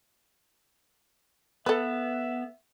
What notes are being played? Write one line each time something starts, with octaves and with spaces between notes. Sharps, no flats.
B3 A4 B4 E5